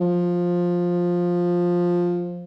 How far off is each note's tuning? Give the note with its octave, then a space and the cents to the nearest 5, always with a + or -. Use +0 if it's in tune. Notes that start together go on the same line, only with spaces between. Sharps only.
F3 +10